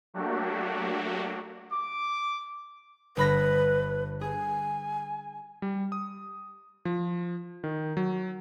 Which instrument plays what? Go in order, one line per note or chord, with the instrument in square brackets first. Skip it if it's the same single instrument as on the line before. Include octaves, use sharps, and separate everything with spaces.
[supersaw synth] F#3 A3 A#3 D4 F#4 G4
[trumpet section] D6
[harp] G1 B5 A#6 [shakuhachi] B4
[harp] G#4 [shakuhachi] G#5
[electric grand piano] G3
D#6
F3
D#3
F#3